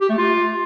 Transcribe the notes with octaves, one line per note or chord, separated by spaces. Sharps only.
G4
A3
F4